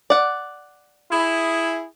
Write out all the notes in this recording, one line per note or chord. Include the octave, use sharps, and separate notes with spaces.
D5 F#5
E4 G#4